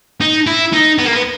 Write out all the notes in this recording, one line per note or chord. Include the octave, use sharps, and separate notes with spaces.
D#4
E4
D#4
B3
A#3
B3